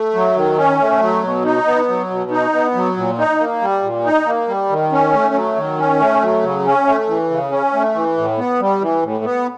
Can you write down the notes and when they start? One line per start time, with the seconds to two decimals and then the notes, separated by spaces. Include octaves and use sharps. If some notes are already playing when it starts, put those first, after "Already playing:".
Already playing: A3
0.14 F#3
0.36 D#3
0.57 C#4
0.80 A3
1.01 F#3
1.23 B2
1.44 D#4
1.66 B3
1.88 F#3
2.10 B2
2.31 D#4
2.53 B3
2.75 F#3
2.97 A#2
3.18 D#4
3.39 A#3
3.61 G3
3.82 A#2
4.04 D#4
4.26 A#3
4.48 G3
4.70 D#3
4.92 C#4
5.14 A3
5.34 F#3
5.56 D#3
5.78 C#4
6.00 A3
6.21 F#3
6.43 C#3
6.65 C#4
6.87 A3
7.08 E3
7.30 C#3
7.51 C#4
7.73 A3
7.95 E3
8.17 A2
8.38 B3
8.60 G3
8.81 E3
9.03 A2
9.24 B3